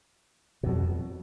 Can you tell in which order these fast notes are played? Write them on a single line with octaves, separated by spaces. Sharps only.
B2 F2 F#3